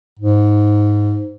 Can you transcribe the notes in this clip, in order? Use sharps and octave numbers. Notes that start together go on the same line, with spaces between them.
G#2